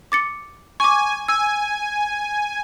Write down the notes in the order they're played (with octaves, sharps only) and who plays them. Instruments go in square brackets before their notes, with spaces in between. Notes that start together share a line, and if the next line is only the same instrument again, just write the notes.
[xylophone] D6 A6 C#7
[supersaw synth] G#5 [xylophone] C#6 D6
[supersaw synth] G#5 [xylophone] E6